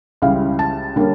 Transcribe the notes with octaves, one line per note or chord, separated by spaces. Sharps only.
C#2 C#3 E3 G3 F5
A5
D3 G3 A#3 C#4